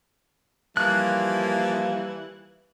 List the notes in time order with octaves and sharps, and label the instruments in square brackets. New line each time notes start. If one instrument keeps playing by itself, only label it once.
[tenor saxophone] E3 [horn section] F3 A#3 [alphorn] G3 [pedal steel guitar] F#6